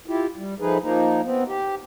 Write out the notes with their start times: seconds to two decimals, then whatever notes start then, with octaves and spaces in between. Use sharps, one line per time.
0.07 E4 F4 G4
0.37 G3
0.60 F3 A3 D#4 G#4 B4
0.82 F3 A#3 D#4
1.24 B3 C4
1.48 G4